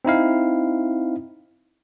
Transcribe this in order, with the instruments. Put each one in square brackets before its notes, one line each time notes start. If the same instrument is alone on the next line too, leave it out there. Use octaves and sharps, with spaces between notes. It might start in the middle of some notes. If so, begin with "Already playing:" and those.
[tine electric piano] C4 D#4 E4 F5